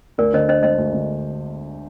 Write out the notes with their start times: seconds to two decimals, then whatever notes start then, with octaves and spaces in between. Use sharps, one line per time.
0.18 D2 A#4 D5
0.34 D3 C5 D#5
0.48 D4 C5 D#5
0.63 G#3 C5 D#5
0.78 D2
0.93 D3